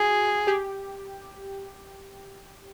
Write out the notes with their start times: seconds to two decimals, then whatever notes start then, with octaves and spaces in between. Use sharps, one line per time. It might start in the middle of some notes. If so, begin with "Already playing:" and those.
Already playing: F#4 G#4
0.47 G4